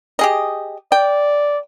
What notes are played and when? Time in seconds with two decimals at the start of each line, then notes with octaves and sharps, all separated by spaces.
0.19 G4 G#4 D#5
0.92 D5 G5